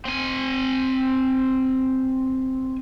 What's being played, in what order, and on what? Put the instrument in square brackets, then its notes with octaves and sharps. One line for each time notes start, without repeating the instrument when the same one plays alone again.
[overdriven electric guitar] C4 G#5